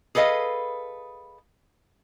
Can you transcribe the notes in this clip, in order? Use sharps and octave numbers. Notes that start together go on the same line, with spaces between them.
G#4 A4 B4 D#5 F5